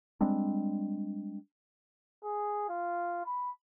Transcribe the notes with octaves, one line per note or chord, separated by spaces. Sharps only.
G3 G#3 C4 D4
G#4
F4
B5